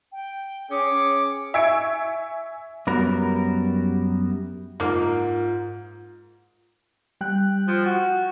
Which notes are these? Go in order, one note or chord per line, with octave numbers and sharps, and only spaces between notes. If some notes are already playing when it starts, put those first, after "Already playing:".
G5
C#4 G#4 D6
E5 G#5 C#6 G#6 C#7 D7
F#2 G3 B3 F#4 A#4 A#5
G#2 A#3 F4
G3 G5 F#6
F3
F#4